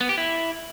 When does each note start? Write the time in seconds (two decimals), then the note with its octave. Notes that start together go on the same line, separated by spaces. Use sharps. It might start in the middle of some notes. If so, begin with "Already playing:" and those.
0.01 B3
0.09 G4
0.18 E4